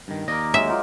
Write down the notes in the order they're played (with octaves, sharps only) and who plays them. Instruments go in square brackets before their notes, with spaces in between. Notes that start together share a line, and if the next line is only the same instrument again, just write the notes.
[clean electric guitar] G2 D#3
[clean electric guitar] D#2 A#3 D#5 [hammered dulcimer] A#4 D5
[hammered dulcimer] F#3 G#3 F#4 [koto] E5
[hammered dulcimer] D#4 F4 D5